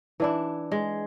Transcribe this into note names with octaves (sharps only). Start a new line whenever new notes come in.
E3 D4 E4
G#3